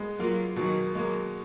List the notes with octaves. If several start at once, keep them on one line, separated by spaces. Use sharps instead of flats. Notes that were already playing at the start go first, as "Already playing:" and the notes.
Already playing: G#3 B3
F#3 A#3 F4
B2 D#3 F#3
F#3 G#3 A#3